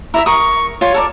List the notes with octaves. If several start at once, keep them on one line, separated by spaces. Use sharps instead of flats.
E4 D5 E5 A#5
A#4 C#6 D#6
F4 C#5 G#5
A4 A#4 D5